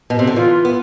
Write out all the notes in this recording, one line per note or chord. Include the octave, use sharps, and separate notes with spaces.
B2
C3
D3
E3 F4
B3